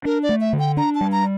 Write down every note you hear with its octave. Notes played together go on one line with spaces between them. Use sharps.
D4 A#4
D5
A3
E5
D3
G5
D4 A#5
A5
G3
A#5